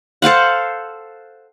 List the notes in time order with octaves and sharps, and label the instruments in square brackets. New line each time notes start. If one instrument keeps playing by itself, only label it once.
[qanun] A4 C5 F5 F#5